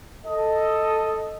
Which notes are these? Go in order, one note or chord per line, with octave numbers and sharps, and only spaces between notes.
A4 D#5